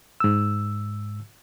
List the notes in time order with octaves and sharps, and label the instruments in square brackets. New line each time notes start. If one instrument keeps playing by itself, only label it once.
[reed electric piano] G#2 E6